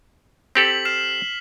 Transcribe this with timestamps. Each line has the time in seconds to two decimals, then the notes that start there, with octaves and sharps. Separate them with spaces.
0.55 C4 G4 A4 B6 F#7
0.85 F6 C7 E7